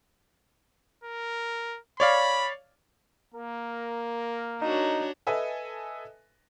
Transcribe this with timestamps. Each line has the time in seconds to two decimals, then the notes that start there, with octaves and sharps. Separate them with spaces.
1.04 A#4
2.00 C#5 D5 F5 B5
3.34 A#3 A#4
4.62 D4 D#4 F#4 C#5
5.27 A4 B4 D#5 E5 G#5